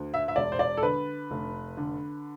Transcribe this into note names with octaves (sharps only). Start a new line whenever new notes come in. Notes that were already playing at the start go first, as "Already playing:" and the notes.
Already playing: D2
E5
E5
E1 D5
C5
D5
A4
D3 B4
F1
D3